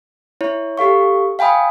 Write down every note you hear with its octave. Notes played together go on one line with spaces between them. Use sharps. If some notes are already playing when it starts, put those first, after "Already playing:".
E4 C#5
G4 A4 F5 C#6
F5 G5 G#5 B5 D#6